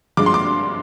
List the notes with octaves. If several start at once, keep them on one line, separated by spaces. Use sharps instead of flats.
G2 F3 G#3 D6
C6
D6